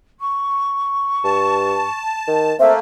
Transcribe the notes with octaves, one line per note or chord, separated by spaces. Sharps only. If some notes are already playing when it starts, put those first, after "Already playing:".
C#6
G2 A5
D#3
A3 A#3 C4 E5